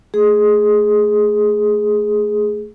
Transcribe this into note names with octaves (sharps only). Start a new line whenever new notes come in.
A3 G#4